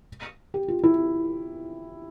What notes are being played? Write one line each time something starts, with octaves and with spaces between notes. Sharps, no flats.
G4
F4
E4